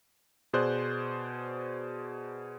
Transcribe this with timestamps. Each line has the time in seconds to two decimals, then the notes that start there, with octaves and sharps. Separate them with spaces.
0.53 B2 G#4 C5 D5 F#6